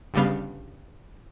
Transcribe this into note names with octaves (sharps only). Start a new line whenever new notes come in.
G1 G2 C#3 G3 B3 F5